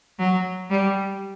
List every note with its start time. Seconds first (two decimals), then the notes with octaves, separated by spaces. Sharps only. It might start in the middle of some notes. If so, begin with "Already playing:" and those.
0.18 F#3
0.69 G3